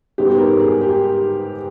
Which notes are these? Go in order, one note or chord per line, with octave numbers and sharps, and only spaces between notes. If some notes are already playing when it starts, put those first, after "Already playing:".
G#2 G3 B3 D#4 G4
A#4
G#4
G4